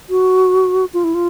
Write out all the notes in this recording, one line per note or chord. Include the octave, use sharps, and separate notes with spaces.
F#4
F4
E4
F4